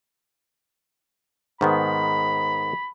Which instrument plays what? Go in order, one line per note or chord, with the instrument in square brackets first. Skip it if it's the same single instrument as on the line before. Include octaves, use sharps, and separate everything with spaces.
[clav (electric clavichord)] G#2 D#3 B3 [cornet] B5